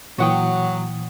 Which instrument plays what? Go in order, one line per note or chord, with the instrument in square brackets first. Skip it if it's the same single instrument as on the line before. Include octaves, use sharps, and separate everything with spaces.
[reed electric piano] A#2 E3 D#6 [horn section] F#3 [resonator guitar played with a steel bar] F#4 F#5 G5